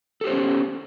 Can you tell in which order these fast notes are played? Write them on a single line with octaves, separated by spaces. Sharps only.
A4 G4 C5 B3 C#4